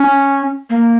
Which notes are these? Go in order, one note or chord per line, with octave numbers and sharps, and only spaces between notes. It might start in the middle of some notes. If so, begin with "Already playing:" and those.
Already playing: C#4
A#3